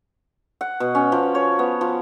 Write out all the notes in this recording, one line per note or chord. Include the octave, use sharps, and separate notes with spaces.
F#5
B2
C#4
F3
C#5
B3
F3